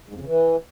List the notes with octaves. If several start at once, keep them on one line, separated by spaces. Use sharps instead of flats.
G#2
F2
C#3
E3